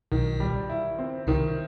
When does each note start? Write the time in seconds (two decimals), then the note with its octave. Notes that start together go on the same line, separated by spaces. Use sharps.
0.12 B1 B2 D#3
0.40 G3
0.69 E4
0.99 C4
1.27 C2 C3 D#3